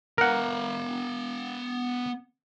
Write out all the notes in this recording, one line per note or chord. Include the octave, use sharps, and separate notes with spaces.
B3 A#4 F5 F#5